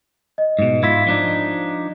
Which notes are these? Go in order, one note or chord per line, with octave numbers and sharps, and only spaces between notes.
D#5
G#2 B2
G#2 E4 F4 G#6 B6
F3 D4 D#4